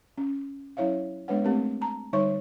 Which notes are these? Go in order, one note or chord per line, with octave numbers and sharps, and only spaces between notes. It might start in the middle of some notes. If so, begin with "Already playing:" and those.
C#4
F#3 C#4 E4 C#5 E5 F5
G#3 B3 D4 B4 C#5 F#5
A3 C4 G4 A#4
A5 A#5
D3 G3 D#4 C#5 E5 C#6